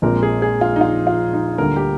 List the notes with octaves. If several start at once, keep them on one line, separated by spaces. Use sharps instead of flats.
A#1 A#2 F3 G#3 C4 A#4
G#4
G#4
F4
D#4
F4
F4
D#4
D2 D3 G3 A#3 A#4
G4